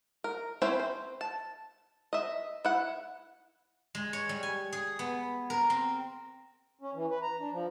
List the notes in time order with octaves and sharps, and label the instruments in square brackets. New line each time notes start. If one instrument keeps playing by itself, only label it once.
[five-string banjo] A#4
C4 C#4 E4 B4 C5
C5
A5
D#5 E5
E4 F#5
[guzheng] G#3
C#5
G3
G#5
G#4
B3
A#4
C4
[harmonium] C#4
E3
B4
A#5
D4
F3